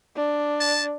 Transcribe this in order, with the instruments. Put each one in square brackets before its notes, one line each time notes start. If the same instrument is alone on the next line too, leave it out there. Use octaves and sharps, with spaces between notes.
[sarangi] D4
[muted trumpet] A5